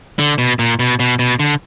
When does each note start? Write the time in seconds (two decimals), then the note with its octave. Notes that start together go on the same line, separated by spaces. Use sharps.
0.19 D3
0.38 B2
0.59 A#2
0.80 B2
1.00 B2
1.19 B2
1.40 D3